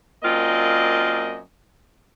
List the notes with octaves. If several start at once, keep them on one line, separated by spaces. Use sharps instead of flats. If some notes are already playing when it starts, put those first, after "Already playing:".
F#2 A#3 C4 F4 D5 D#5